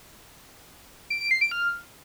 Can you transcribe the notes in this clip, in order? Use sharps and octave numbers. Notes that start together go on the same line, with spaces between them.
D7
D7
C7
D7
F6